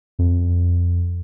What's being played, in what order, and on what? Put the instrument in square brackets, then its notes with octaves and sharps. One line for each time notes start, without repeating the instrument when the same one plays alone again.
[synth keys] F2